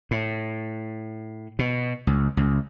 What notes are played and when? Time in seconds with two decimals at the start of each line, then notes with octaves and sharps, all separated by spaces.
0.11 A2
1.59 B2
2.07 C#2
2.37 C#2